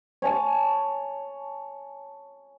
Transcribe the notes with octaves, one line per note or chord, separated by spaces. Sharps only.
C#5 G#5 A5